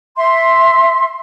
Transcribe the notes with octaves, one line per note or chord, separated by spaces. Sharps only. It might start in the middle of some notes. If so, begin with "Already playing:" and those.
E5 C6